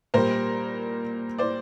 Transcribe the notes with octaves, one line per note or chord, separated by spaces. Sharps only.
A#2 G3 A#4 C5
C5 D5